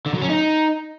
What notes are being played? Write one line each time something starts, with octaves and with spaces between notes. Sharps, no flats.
D3
F#3
C#4
D#4